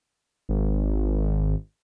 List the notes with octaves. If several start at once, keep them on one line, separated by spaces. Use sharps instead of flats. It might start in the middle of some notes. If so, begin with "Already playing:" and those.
G#1